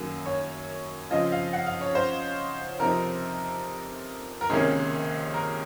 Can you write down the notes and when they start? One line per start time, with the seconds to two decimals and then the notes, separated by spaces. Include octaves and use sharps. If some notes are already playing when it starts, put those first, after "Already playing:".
Already playing: F#2 D#3 F#3 A#3
0.26 C#5
1.10 C#3 F3 C4 F4 D#5
1.32 F5
1.53 F#5
1.66 F5
1.81 C#5
1.95 C5
2.79 F2 C3 F3 C4 D#4 A#4
4.41 A#4
4.50 C#2 C3 D#3 A#3 C#4 G#4
5.34 A#4